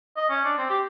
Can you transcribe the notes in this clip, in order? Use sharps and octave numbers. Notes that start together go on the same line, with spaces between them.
D#5
C#4
D4
C4
G4